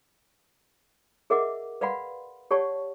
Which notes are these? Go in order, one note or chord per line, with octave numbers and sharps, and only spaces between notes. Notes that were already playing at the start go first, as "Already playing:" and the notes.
G#4 A#4 D#5 E5 F#5 D6
B4 D5 F5 F#5 B5 C6
G4 C#5 D5 F#5 A5 C#6